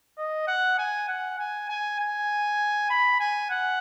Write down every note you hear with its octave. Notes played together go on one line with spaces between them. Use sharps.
D#5
F#5
G#5
F#5
G#5
G#5
G#5
B5
G#5
F#5